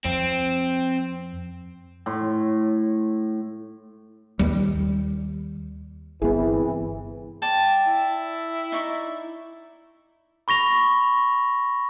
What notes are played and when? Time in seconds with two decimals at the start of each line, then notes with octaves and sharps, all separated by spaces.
0.05 F2 C4
2.06 A2 C6
4.39 D#2 G3
6.22 G1 C3 E3 B3 E4 G#4
7.42 D5 G5 A5
7.86 E4
8.72 D#4 D5 C#6
10.48 B5 C#6 A#6 F7